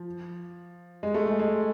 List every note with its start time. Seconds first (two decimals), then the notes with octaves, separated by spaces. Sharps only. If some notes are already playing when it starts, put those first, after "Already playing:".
Already playing: F3
1.03 G#3
1.14 A3
1.28 G#3
1.39 G#3